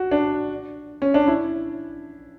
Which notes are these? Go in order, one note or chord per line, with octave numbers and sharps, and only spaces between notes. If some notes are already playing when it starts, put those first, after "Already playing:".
Already playing: F#4
D4
C#4
D4
E4